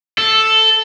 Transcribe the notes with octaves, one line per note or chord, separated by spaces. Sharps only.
A4